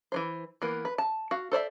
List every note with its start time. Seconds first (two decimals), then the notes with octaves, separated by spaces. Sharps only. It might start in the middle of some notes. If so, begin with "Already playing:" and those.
0.12 E3 F#3 C5
0.62 E3 A#3 B3
0.85 B4
0.98 A5
1.31 F#4 F5
1.52 A4 C5 D5 E5